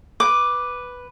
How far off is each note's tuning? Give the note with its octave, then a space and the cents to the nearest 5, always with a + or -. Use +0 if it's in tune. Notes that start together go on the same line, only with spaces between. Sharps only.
B4 +0 D6 +0